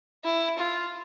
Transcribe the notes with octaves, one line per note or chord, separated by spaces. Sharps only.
E4
F4